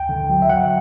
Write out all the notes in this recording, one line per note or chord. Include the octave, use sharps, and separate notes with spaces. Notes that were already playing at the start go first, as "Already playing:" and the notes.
Already playing: D2 G5
D3
F#3
E5
F#3 F#5